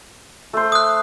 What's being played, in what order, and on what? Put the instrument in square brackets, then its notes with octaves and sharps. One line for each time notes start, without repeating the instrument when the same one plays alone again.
[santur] A3 C5
[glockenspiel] D#6 F#6